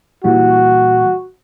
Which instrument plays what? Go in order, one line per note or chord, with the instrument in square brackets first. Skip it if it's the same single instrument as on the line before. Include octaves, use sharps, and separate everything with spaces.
[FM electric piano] A#2 E3 G3 [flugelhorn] F#4